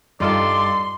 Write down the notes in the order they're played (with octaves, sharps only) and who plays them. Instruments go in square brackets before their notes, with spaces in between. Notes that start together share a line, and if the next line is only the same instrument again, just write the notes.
[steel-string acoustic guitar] G2 A5 [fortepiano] D#4 F4 A4 [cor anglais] D5 [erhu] C6